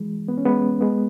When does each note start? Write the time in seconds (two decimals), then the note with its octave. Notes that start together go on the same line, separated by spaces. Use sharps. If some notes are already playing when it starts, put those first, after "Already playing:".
Already playing: E3 G#3
0.28 B3
0.38 C#4
0.45 G#3 B3
0.81 G#3 B3